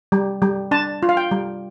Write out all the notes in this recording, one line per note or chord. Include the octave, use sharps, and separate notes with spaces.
G3
G3
D4 A5
F4
F5
G5
G3